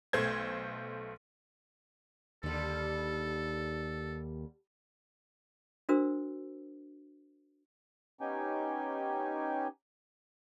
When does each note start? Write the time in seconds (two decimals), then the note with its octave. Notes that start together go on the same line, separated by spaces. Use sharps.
0.13 B1 A3 C5 G#6
2.43 D#2 D3 G3 A4
5.89 D4 F#4 A#4 C5 E6
8.21 B3 C#4 D#4 G4 G5 G#5